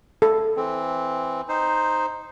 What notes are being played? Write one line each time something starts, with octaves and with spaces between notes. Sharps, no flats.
A4
E3 C4
D#4 C5